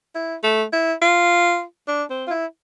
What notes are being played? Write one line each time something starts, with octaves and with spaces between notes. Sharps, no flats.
E4
A3
E4
F4
D4
C4
F4
E4